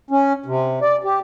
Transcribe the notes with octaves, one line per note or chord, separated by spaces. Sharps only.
C#4
C3
D5
G4